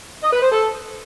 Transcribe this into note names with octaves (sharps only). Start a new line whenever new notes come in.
D#5
B4
C5
A4